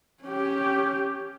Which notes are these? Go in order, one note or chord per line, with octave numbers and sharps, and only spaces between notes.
C#4 G4